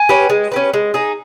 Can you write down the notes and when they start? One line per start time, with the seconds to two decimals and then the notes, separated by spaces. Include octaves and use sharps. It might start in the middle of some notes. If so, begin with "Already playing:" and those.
Already playing: G#5
0.09 C#4 G4 B4
0.30 G#3
0.52 C#4 G4 B4
0.74 G#3
0.94 D#4 G#4